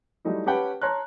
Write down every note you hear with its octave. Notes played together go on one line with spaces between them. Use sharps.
F#3 G3 A3 D#4 E4
C#4 G4 B4 F#5 G5 A5
C#5 A5 A#5 C6 F6 F#6